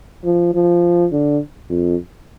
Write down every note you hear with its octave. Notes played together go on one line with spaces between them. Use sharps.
F3
F3
D3
F2